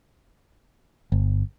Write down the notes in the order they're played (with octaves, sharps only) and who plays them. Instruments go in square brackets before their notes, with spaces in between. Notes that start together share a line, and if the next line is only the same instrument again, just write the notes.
[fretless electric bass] G1